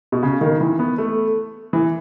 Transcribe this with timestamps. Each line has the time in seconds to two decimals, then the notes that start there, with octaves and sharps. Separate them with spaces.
0.12 B2
0.23 C#3
0.41 D#3
0.61 E3
0.79 B3
0.98 A3
1.73 E3